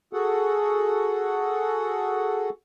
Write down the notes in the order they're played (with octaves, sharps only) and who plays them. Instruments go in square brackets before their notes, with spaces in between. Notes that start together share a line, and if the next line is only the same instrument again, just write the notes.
[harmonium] F#4 G#4 A4 F#5